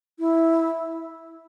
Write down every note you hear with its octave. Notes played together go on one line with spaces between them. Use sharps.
E4